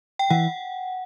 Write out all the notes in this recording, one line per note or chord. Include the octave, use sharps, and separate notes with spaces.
G5
E3 F#5